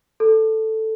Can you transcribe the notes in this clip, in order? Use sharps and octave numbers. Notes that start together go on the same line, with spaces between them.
A4